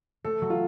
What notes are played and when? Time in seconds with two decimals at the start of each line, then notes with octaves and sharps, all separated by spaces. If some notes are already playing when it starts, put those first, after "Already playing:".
0.24 A3 A4
0.41 F#3
0.50 F4